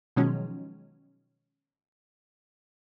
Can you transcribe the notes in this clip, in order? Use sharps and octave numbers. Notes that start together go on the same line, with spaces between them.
B2 D#3 F3 F#3 G#3 C#4